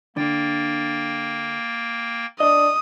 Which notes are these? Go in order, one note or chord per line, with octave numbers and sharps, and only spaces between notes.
D3 A#3 G5 A6
D4 D#5 D#6